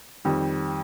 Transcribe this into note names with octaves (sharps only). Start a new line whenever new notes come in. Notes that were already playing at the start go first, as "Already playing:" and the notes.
F2 D#3 G3